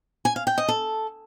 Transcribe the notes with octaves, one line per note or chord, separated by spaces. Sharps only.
G#5
F5
G5
D#5
A4